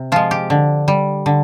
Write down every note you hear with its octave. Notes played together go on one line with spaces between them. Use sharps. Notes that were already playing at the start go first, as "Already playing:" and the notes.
Already playing: C3
F3 G#3 F4
G4
D3
G3
D3